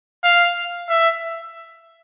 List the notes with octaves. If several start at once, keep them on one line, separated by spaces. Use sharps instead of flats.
F5
E5